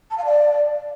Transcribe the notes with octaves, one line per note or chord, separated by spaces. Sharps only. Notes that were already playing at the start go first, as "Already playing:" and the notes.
A5
F5
D5